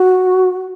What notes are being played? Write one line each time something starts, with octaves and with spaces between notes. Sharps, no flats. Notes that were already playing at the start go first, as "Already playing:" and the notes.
Already playing: F#4